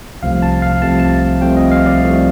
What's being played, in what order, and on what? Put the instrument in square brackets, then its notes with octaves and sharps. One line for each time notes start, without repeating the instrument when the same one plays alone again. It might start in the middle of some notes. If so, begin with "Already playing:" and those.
[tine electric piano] C2 C3 F3 A3 F5
A5
F5
C2 C3 F3 A3 A5
A5
C2 C3 F3 A3 G5
D#5
F5
D5
C2 C3 F3 A3